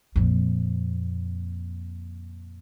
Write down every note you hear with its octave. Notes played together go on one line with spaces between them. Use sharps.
F2 A#2